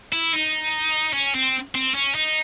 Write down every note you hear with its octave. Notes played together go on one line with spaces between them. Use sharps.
E4
D#4
C#4
C4
C4
C#4
D#4